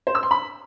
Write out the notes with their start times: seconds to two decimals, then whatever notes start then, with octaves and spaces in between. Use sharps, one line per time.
0.07 C5
0.15 E6
0.23 C6
0.31 B5